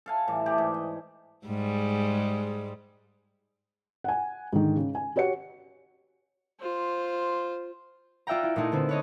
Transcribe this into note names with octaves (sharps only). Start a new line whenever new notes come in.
A4 F5 G#5
A2 E3 G3
A3 G4 G#4 D5
G#2
D#5
G#2 G3 G#3
F#5 G#5
G#2 D3 D#3
C#3
G#5
F#4 G4 C#5 F#5 C#7
F4 C5
F4 D5 E5 F#5 G5 A#5
E4
A#2 G#3 A3 D#4 E4
D3 B3 C4
B4 C#5 D#5